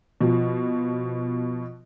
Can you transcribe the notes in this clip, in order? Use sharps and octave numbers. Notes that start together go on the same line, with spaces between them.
B2 F3